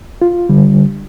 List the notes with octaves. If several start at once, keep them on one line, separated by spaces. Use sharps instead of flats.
F4
D3 G3